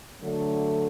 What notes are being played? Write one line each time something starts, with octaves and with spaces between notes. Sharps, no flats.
D3 F#3 A3